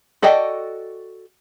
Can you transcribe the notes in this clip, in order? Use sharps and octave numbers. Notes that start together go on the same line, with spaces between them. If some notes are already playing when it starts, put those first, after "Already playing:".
F#4 A4 D5 D#5 G5